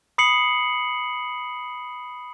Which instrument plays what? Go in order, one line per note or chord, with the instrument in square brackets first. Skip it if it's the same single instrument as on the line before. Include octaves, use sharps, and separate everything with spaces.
[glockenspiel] B5 D#6 C7 C#7 F#7